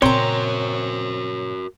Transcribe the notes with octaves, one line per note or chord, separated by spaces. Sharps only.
A#2 C#3 C4 F#4 A#4 C#5 A#5 C6